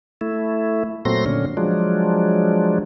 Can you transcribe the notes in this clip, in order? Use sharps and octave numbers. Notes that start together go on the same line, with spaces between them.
A3 E4
A#2 F#3 A3 C4 C6 A#6
A#2 D3 C#4
F3 F#3 G#3 D4